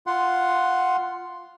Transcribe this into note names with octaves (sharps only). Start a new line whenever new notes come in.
F4 F#5 C6